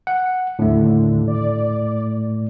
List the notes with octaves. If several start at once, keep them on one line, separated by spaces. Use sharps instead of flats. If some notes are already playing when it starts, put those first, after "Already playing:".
F#5
D#2 A2 D3 A3
D5